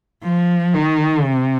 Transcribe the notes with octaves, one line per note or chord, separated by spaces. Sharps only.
F3
D#3
C3